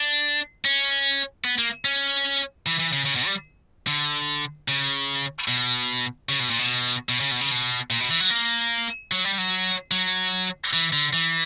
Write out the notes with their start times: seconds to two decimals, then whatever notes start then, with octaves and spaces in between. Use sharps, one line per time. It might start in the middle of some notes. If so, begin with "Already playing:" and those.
Already playing: D4
0.65 C#4
1.44 B3
1.58 A#3
1.85 C#4
2.66 E3
2.79 E3
2.93 C#3
3.06 C#3
3.16 B2
3.26 G3
3.87 D3
4.68 C#3
5.48 B2
6.29 C#3
6.39 B2
6.50 A#2
6.59 B2
7.09 B2
7.20 C#3
7.31 B2
7.41 C#3
7.51 B2
7.90 A#2
8.01 B2
8.10 E3
8.20 F#3
8.30 A#3
9.12 F#3
9.25 G3
9.38 F#3
9.91 F#3
10.73 E3
10.93 D3
11.13 E3